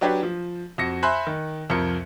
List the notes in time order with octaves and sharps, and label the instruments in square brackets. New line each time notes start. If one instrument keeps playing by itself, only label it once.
[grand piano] F#3 D4 G4 B4 C#5
F3
F2 F#4 A#6 C#7
C5 E5 G#5 B5 C6 F#6
D#3
C2 F2 F3 A#4 C#7